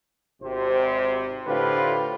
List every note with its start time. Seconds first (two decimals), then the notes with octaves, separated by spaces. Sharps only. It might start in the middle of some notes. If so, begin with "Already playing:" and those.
0.42 G#1 C3 C5
1.46 A2 D3 F4 G4 B4 C5